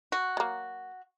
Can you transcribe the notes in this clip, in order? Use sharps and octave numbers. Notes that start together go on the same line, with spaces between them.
F#4
F#3 A#3